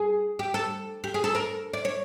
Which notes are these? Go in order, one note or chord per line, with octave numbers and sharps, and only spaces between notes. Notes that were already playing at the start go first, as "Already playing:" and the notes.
Already playing: G#4
G4
A4
G4
G#4
A4
A#4
D5
C#5